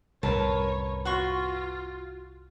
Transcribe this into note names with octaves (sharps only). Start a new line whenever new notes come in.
C2 F#2 A2 A#4 B4 C#5 A5
F4 F#4 C6 C#6